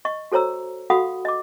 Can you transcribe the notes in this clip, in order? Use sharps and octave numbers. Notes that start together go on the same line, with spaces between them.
D#5 C#6
F#4 A4 C5 C#5 A#5 E6
F#4 A4 F5 F#5 B5 D#6
D#5 D6